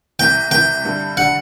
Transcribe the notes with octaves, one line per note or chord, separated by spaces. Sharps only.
C2 C3 E3 G5
C2 C3 E3 G5
G2 D3 G3
D3 G3 F#5